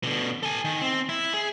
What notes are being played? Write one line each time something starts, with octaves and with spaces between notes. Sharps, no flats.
B2 D3
A4 G#5
D#3
C4
E4
G#4